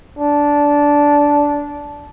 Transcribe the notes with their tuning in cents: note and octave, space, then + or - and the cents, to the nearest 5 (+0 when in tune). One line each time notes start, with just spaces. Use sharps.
D4 -15